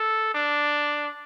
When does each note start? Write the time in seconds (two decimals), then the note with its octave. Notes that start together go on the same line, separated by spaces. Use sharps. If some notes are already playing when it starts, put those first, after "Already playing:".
Already playing: A4
0.34 D4